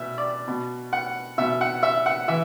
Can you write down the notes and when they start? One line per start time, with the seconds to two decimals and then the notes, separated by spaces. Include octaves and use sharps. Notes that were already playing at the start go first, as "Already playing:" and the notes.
Already playing: B2 E5
0.18 D5
0.48 B2
0.93 F#5
1.38 B2 E5
1.61 F#5
1.83 E5
2.06 F#5
2.28 E3 E5